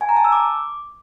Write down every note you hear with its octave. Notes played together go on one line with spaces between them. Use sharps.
G#5
A#5
A5
E6
D6